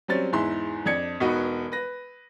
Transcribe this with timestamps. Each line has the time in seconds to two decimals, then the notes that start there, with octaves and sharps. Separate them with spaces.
0.08 F#3 G3 C4 C#4 A6
0.32 E2 G#2 E4 C6
0.86 F2 D4 G#6 C#7
1.20 E1 B3 D#4 F#4 B4
1.72 B4 A#6